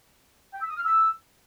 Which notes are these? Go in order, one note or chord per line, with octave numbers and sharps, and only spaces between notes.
G5
E6
D#6
F6
E6